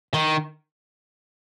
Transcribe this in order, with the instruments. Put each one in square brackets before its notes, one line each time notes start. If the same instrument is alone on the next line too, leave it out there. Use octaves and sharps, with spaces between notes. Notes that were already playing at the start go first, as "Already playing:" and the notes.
[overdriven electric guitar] D#3